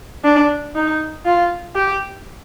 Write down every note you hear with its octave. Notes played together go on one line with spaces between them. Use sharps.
D4
D#4
F4
G4